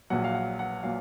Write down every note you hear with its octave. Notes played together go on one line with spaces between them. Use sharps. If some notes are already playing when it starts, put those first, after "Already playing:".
A#1 A#2 F#3 F#5
F5
F#5
F#5
A#2 F#3 F5